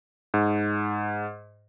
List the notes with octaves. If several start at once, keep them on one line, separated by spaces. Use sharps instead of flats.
G#2